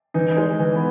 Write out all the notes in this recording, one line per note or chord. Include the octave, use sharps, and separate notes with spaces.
E3 D#4
G#3
E3
B3